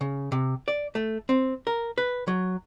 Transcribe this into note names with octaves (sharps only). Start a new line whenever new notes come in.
C#3
C3
D5
A3
C4
A#4
B4
F#3